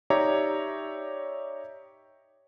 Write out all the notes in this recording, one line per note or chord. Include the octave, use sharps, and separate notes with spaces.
D#4 G4 C#5 D5 E5 A#5